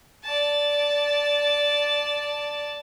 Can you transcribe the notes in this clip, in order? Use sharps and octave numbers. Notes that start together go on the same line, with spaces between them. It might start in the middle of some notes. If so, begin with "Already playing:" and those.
D5 A5